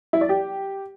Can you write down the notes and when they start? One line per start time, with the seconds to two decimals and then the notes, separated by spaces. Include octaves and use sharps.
0.13 E4
0.21 D5
0.29 G4